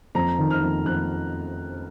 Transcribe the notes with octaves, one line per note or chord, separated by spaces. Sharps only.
F2 A#5
D#3
F6
F2
F2 F#6